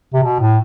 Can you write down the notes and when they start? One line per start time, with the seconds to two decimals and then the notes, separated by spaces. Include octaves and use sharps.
0.14 C3
0.23 B2
0.40 A2